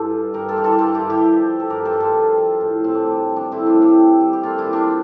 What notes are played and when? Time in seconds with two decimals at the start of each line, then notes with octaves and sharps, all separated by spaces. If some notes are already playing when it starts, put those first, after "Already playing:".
Already playing: G2 E3 F4 G4 A4
0.11 G3
0.34 G2 G4 A#4
0.48 F4 A4
0.56 E3 G4
0.64 F4 A4
0.73 G4
0.78 G2 F4 A4
0.94 E4 G4
1.01 G2
1.10 E4 G4
1.24 F3
1.47 F3
1.60 A4
1.70 G2 G4 A#4
1.85 F4 A4
1.93 G2 G4
2.00 F4 A4
2.15 F3
2.38 F3
2.61 A2
2.83 A2 C4
2.94 D4
3.06 G3 D4
3.29 G3
3.36 D4
3.51 A2 C4 E4
3.66 D4 F4
3.74 A2
3.82 E4 G4
3.98 G3
4.21 G3
4.33 G4
4.43 A#2 F4 A4
4.58 E4 G4
4.66 A#2
4.73 D4 F4